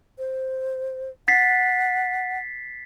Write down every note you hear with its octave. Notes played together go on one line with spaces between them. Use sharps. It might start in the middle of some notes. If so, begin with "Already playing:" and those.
C5
F#5 A6 B6 C7